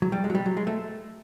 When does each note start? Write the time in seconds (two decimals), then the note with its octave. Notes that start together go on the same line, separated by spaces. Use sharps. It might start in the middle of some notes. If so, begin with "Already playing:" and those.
0.02 F#3
0.12 G3
0.24 G#3
0.30 F#3
0.35 G3
0.46 F#3
0.57 G#3
0.67 A3